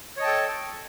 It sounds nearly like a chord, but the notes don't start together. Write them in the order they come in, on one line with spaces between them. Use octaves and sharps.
C#5 D#5 A5 G5 A4